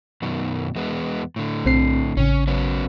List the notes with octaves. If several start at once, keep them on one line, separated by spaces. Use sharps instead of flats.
F#2 B2 D#3
E2 G#3 B3
A2 D3
B1 C4 C7
A1 C#3 C#4
F#3 B3 C#4